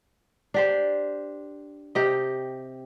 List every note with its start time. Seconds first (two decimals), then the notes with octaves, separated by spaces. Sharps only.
0.54 D4 G4 C5
1.95 C3 G4 D#5